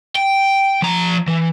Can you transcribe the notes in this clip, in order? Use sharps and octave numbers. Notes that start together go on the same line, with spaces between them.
G5
F3 A#5
E3